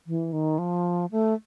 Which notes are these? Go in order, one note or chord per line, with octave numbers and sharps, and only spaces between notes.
E3
D#3
F3
A3